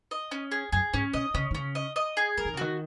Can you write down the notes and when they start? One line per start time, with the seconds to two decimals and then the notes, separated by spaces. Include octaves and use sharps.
0.11 D#5
0.31 C#4
0.51 G#4
0.72 F#2 G#4
0.94 G#2 C#4
1.13 B2 D#5
1.34 C#3 C#4
1.51 D#3
1.55 C#3 C#4
1.75 D#5
1.96 D#5
2.17 G#4
2.38 F3 A#4
2.45 D#3
2.53 C#3
2.57 D#3 F#4